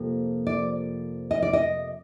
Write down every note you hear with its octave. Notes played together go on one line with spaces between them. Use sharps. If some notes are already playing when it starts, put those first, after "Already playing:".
Already playing: F2 C3 F3 A#3
D5
D#5
D5
D#5